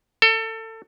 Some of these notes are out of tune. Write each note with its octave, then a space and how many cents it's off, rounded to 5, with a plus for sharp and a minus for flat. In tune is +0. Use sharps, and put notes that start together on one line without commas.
A4 +25